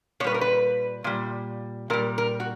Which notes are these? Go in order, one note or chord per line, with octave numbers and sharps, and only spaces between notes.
A#2 G3 B4 C#5
A#4
B4
A#2 G3
A#2 G3 A#4
A#4
F#4